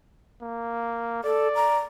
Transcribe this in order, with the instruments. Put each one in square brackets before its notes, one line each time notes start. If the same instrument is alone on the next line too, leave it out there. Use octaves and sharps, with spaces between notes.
[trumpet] A#3
[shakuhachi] A4 [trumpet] D5
[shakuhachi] A#5